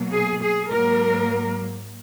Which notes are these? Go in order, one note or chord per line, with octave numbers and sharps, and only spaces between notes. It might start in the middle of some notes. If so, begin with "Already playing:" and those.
Already playing: B2 F#3 A#3
G#4
G#4
G#2 F#3 A#3 A#4